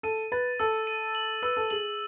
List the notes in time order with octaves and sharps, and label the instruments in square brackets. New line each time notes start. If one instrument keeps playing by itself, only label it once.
[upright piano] A4 [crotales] D#7
[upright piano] B4 [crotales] A6
[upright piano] A4 [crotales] E6
[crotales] D#7
F#7
[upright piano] B4 [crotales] E6
[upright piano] A4
[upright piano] G#4 [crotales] F#7